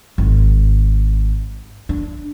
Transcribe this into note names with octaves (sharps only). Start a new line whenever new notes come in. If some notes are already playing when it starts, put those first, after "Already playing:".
G#1
D4